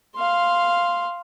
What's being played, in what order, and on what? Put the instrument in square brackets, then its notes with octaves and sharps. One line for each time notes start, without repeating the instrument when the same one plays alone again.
[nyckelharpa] F5 C6